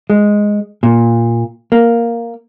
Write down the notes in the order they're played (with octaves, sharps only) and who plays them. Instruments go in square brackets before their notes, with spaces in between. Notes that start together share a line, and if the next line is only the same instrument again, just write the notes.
[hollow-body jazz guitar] G#3
A#2
A#3